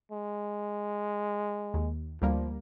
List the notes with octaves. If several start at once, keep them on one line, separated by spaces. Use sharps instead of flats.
G#3
D#2
D2 F3 G3 A#3